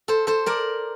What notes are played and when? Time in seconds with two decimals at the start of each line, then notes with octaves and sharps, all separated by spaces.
0.08 A4 C5
0.27 A4 C5
0.46 A#4 D5